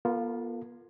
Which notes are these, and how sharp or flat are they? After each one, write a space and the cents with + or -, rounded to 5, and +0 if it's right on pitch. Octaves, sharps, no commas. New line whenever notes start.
B3 -40 F4 +0 A4 +35